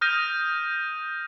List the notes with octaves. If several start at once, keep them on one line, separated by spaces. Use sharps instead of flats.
D#6 F6 G6 A#6 D#7